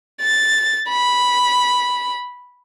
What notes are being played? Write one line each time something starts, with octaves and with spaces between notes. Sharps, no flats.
A6
B5